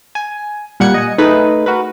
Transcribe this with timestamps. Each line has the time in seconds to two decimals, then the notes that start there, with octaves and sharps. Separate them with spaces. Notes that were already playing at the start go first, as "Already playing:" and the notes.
0.15 G#5
0.80 A#2 G3 F#5 G#6 C#7
0.94 D#5 F#5 G#5
1.18 A3 D#4 G#4 B4
1.66 F#4 A#4 B4